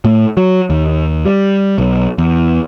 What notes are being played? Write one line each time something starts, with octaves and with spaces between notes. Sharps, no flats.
A2
F#3
D#2
G3
B1
E2